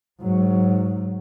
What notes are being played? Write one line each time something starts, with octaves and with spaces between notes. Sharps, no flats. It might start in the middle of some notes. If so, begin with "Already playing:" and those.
G#2 F#3